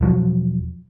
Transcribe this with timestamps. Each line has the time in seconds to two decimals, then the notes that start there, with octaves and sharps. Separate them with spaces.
0.01 E1 F3 F#3